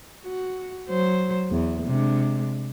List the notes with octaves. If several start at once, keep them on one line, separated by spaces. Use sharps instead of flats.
F#4
F#3 C5
E2
C3 G#3 D4